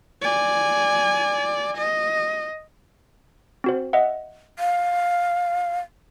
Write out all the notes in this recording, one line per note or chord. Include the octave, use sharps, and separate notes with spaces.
D5 G#5
D#5
C4 F#4 C5
D#5 E5 F#5
F5